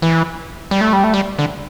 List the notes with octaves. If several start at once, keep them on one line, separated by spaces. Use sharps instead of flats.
E3
G3
A3
G3
A3
G3
D3